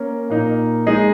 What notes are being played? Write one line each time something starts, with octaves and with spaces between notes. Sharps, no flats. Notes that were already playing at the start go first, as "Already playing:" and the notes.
Already playing: A#3 C#4 A#4
A#2 A#3 D#4
G#3 D#4 G#4 D#5